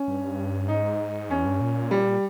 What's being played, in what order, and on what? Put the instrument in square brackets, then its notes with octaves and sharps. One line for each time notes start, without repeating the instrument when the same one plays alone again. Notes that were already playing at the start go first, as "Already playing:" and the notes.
Already playing: [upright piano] C#4
[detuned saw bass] G2
[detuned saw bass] G#2 [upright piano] D#4
[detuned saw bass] E2 [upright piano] C#4
[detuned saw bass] G2
A#2
[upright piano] G3